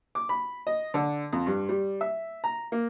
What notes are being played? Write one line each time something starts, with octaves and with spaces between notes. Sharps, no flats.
D6
B5
D#5
D3
F2
G2
G3
E5
A#5
A#3